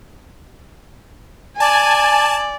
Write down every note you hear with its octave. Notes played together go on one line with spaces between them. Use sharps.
D5 G#5 A5